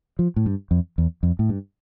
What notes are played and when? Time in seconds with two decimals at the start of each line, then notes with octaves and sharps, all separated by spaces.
0.19 F3
0.36 A2
0.46 G2
0.71 F2
0.98 E2
1.23 F2
1.39 A2
1.49 G2